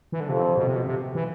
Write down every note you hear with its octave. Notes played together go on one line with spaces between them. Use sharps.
E3
D3
F2 C3
B2
C3
B2
C3
E3